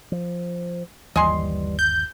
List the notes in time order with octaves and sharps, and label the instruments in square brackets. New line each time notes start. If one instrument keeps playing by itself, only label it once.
[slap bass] F3
[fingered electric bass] G1 D#2 [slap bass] E3 G3 [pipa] D#5 G#5 C6
[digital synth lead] G6